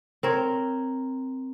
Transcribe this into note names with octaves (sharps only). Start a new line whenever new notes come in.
C4 A#4 C#5